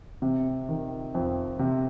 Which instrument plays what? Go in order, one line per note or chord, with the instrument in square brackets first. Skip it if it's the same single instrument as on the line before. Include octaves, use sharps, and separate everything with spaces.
[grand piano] C3
D#3
F2
C3